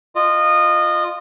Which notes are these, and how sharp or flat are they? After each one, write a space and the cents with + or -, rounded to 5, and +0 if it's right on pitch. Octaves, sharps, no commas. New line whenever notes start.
F4 +0 D#5 -25